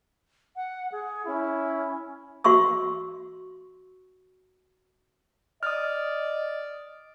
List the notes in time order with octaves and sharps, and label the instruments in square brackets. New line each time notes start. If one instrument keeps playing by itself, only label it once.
[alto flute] F#5
G#4
[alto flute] C#4 [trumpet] E4
[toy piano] F#4 E5 C6 C#6 E6
[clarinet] D5 [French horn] D#5 [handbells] D#6 F6